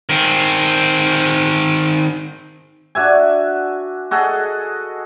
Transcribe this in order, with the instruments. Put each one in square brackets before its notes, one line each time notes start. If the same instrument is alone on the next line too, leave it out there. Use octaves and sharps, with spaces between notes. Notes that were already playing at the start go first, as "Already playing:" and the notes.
[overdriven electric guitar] D#3 C4
[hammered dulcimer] D4 F#4 E5 G#5
F#4 G#4 A4 D#5